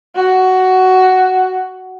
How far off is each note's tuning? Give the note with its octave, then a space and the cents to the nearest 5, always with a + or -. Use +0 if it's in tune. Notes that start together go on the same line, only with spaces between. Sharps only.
F#4 +10